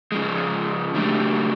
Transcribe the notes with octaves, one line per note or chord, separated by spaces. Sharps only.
C#3 F3 G#3
C#3 F#3 A3 D4 G4